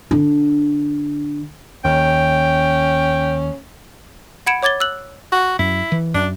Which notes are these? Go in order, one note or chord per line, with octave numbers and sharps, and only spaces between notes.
D3 D4
D#2 C#4 G5
F#5 B5 G#6 C#7 D7 E7
C#5 D6 G#6 A6 G7
E6 F#6 F#7
F#4
F#2 E4
E3
F#2 D4